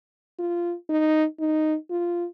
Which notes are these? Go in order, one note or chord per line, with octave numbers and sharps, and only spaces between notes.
F4
D#4
D#4
F4